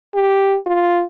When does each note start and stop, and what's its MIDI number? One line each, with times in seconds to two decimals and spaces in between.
0.14 0.56 67
0.66 1.03 65